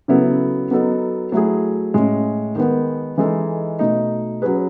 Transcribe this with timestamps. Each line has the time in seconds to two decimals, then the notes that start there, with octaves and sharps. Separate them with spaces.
0.08 C#3 F#3 B3 E4 A4
0.71 F#3 B3 D#4 A4
1.32 F#3 A3 E4 G#4
1.94 A2 G#3 C#4
2.55 D#3 G#3 B3
3.18 E3 G#3 D#4 A4
3.79 B2 A3 D#4
4.42 F#3 C#4 G#4 B4